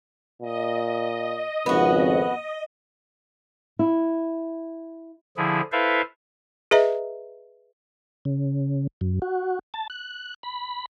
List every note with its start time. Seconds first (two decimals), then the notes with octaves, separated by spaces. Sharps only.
0.42 A#2 D#5
1.66 G#1 F2 C#3 B3 F#4
3.79 E4
5.37 D3 F3 E4 G#4
5.72 E4 A4 B4 C5 E5 F5
6.71 G#4 B4 D#5 E5 A#5
8.25 C#3
9.01 F#2
9.22 F#4
9.74 A5
9.90 F#6
10.43 B5